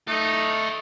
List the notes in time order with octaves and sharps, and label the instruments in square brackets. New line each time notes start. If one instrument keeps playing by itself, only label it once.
[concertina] A3 [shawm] D#4 [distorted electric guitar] A4 D#5